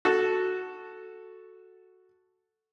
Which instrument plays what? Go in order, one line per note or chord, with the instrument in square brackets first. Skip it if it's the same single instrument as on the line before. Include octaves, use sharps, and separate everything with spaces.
[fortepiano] F#4 A4